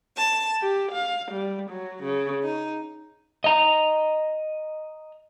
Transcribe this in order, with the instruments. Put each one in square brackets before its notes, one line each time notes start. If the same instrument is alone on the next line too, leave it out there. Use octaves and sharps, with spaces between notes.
[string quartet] A5
G4
F5
G3
F#3
C#3
D#4
[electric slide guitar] D#5 A#5